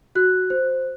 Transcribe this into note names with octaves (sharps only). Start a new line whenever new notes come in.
F#4 F#6
C5